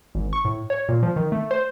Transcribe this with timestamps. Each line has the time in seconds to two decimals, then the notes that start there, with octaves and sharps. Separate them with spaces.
0.15 G#1
0.33 C#6
0.45 A2
0.70 C#5
0.89 A#2
1.03 F3
1.16 D#3
1.32 A3
1.51 C5